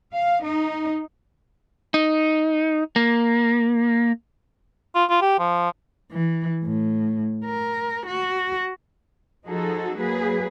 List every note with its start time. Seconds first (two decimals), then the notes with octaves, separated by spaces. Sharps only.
0.14 F5
0.43 D#4
1.94 D#4
2.96 A#3
4.95 F4
5.09 F4
5.21 G4
5.39 F3
6.12 E3
6.63 A2
7.45 A#4
8.06 F#4
9.46 F3 D#4 F#4 G#4 A4
9.95 F#3 A#3 G#4 B4